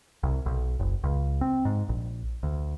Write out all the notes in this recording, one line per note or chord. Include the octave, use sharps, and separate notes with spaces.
C2
B1
F#1
C#2
C4
G#2
A#1
D2